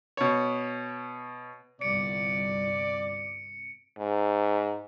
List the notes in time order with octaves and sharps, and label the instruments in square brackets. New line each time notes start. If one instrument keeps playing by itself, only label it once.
[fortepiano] B2 C#5
[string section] G1 C2 [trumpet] D5 [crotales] C#7 D7
[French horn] G#2